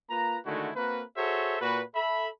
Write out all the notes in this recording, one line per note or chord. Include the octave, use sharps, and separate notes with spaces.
A#3 F4 B4 A#5
D3 D#3 G#3 A3 E4 F#4
A#3 C4 F#4 A#4 B4
F#4 G#4 A4 C5 C#5 E5
A#2 F#4 B4
A4 E5 B5